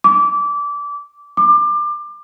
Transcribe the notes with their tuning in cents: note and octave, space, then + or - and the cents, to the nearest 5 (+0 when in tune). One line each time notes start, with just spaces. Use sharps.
D6 -25
D6 +25